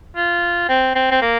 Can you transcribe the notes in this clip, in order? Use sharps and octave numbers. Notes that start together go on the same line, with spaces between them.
F4
C4
C4
C4
A#3